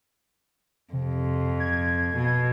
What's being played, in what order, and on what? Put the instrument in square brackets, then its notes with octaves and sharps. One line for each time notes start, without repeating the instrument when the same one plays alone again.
[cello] F2 [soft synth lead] C3
[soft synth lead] G#6
[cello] B2